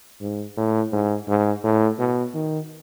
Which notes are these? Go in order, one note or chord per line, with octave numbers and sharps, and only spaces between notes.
G#2
A2
G#2
G#2
A2
B2
D#3